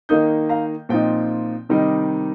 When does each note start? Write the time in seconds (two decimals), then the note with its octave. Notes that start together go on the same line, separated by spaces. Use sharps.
0.09 D#3 A#3 D#4 D#6 G6
0.49 F5 A#5
0.89 A#2 F3 C4 D#4 G5
1.69 C3 D#3 G3 D#4